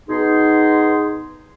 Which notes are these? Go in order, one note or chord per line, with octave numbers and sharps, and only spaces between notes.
B2 D#4 G#4 C6